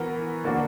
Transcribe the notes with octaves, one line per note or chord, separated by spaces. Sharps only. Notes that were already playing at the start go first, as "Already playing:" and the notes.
Already playing: E3 B3 F#4 A#4
D3 A#3 D4 F#4